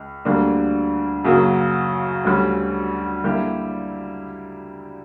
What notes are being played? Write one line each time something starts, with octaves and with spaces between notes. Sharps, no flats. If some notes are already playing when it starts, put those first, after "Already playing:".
Already playing: C#2
D2 D3 G3 A#3 D4
F#2 C#3 F#3 A#3
D2 D3 G3 C#4
D3 G3 A#3 E4 G4